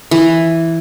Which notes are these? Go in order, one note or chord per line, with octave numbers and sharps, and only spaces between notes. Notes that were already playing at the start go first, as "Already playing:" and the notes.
E3